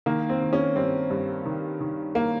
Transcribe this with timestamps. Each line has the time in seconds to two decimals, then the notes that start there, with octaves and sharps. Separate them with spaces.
0.06 D#3 A#3
0.29 C4
0.42 D#3
0.53 C#4
0.75 G2 C4
1.10 G2
1.46 D#3
1.81 D#3
2.15 A#3